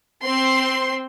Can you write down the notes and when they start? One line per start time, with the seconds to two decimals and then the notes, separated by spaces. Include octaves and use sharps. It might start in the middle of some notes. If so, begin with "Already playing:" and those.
0.23 C4 C6